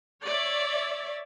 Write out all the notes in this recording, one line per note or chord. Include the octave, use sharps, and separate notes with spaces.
C#5 D5 E5